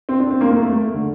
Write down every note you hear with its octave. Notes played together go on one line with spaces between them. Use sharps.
C4
D4
C4
A#3
A#3
A3
A3
D3